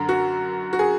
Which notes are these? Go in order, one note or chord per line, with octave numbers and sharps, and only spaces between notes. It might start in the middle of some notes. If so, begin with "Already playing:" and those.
Already playing: F#2 D3
F#4
F#4
G#4